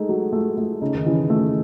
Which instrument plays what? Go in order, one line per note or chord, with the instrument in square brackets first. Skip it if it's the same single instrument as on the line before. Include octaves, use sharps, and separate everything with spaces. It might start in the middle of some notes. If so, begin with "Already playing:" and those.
Already playing: [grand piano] G#3 A3 [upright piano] D#4
[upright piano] F#3
A3
A3
[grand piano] C#3 [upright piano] D#4
[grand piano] D#3
[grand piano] C#3 [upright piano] E3
[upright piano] A3